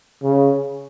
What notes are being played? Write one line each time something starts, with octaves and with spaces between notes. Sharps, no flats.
C#3